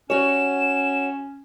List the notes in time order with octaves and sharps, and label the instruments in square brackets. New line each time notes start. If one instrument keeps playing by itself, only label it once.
[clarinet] C#4 [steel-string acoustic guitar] F#4 C#5 [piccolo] E7